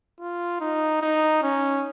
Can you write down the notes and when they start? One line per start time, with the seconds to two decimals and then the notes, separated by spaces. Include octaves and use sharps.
0.20 F4
0.61 D#4
1.02 D#4
1.43 C#4